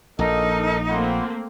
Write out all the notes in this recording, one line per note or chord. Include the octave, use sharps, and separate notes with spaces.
A#1 D#4 A4 A#4 D#5
A3 A#3 C4 F4 F#5 B5